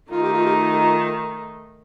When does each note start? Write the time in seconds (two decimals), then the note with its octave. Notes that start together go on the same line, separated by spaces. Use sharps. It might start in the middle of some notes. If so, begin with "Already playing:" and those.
0.10 D#3 A3 D#4 F4
0.22 G4
0.33 F4
0.46 G4
0.55 F4
0.73 G4
0.77 F4